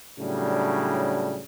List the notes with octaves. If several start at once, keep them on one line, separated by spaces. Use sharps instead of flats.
A2 C#3 F#3 G3 D4